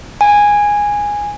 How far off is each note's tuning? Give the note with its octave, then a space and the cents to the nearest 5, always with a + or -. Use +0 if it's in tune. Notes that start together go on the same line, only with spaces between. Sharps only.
G#5 -10